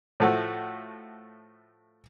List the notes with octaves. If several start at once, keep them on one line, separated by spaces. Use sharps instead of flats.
A2 F3 A3 F#4